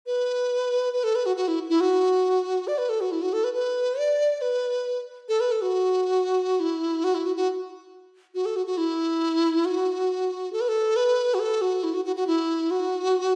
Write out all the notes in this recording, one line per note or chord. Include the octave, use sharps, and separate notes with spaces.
B4
B4
A4
B4
F#4
F#4
E4
E4
F#4
D5
B4
A4
F#4
E4
F#4
A4
B4
B4
D5
B4
A4
B4
A4
F#4
E4
F#4
E4
F#4
F#4
F#4
A4
F#4
F#4
E4
F#4
A4
B4
A4
B4
F#4
A4
F#4
E4
F#4
F#4
F#4
E4
F#4